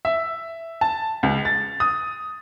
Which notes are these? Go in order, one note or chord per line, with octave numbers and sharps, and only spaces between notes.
E5
A5
C#2
A6
D#6